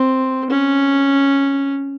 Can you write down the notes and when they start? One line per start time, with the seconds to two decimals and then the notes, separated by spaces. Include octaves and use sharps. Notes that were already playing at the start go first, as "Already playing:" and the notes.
Already playing: C4
0.50 C#4